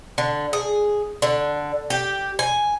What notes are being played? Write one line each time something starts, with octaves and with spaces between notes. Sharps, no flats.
D3
G#4
D3
G4
G#5